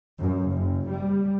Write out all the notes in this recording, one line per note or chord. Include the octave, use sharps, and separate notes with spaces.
F#2
F#1
G3